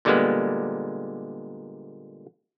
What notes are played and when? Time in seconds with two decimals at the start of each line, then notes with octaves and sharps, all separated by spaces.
0.05 A#2 D3 G3 G#3 A#3 B3